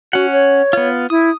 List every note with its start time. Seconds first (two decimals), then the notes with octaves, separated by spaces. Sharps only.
0.13 C#4 F#4 F#5
0.32 C#5
0.73 B3 F4
1.10 E4 D#6